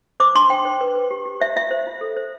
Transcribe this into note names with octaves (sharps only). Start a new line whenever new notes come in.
C5 D6
D4 C6
C5 G5
C5
B4
B4
G4
G4
C5 E5
F4 E5
C5
F4
A4
C5